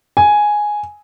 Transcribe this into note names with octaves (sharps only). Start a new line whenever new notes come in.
G#5